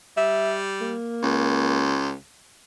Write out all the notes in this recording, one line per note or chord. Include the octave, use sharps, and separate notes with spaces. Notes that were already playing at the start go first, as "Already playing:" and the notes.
G3 E5
A#3
C#2